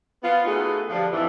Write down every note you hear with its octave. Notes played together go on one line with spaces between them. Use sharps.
B3 F4
A3 B3 D#4 F#4 G#4 A4
D3 F3 G3
F2 G#2 E3